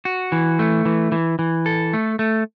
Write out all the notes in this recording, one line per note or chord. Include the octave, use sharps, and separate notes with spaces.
F#4
E3
A3
E3
E3
E3
A4
A3
A3